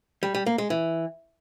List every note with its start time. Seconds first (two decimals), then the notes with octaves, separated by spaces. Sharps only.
0.23 G3
0.35 G3
0.46 A#3
0.58 G#3
0.70 E3